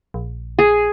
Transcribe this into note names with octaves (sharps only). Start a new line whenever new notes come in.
A#1
G#4